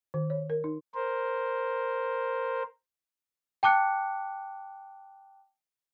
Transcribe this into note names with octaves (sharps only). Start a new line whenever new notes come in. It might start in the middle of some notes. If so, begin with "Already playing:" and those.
D#3
C#5
A#4
D#4
A#4 C5
G5 A5 D6 F#6 C#7